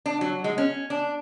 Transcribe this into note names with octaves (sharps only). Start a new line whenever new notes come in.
D4
F#3
G#3
C#4
D4